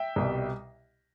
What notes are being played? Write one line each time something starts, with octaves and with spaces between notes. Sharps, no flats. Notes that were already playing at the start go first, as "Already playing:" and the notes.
Already playing: E5 G5
C2 B2 G3